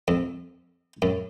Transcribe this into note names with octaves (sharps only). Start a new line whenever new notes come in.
F2
F#2